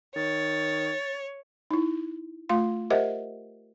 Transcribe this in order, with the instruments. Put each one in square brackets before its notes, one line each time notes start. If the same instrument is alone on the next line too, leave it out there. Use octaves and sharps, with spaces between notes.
[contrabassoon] D#3 [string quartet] C#5 [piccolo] A6
[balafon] D#4 E4
A3 F4 F5 C6
G4 A#4 C5 D#5 E5 F#5